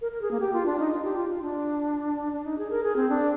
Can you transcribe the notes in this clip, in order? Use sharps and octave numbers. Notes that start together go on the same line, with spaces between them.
A#4
A#4
G#4
A#3
G4
F4
D4
D#4
F4
G4
F4
F4
D4
D4
D#4
G#4
A#4
G#4
C4
D4